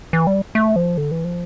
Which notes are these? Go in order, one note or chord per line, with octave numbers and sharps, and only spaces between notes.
E3
G3
A3
F3
D3
E3
F3